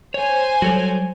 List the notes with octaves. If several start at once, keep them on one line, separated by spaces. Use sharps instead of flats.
C5 C#5 G#5
F#3 G3 F#4 A4 C#5